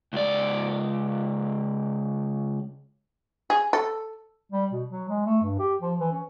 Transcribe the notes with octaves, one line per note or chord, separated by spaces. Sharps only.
C#2 D5
G#4
A4
G3
B2
F#3
G#3
A3
G2
G4
F3
E3
C#4